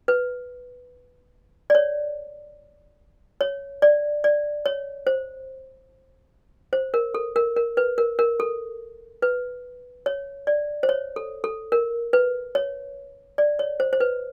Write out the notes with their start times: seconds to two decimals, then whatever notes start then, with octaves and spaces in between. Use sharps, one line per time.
0.08 B4
1.70 D5
1.75 C#5
3.41 C#5
3.82 D5
4.24 D5
4.66 C#5
5.07 C5
6.73 C5
6.94 A#4
7.14 A4
7.36 A#4
7.57 A#4
7.77 B4
7.98 A#4
8.19 A#4
8.40 A4
9.22 B4
10.06 C#5
10.47 D5
10.83 C5
10.89 C#5
11.16 A4
11.44 A4
11.72 A#4
12.13 B4
12.55 C#5
13.38 D5
13.59 C#5
13.80 C5
13.93 C5
14.00 B4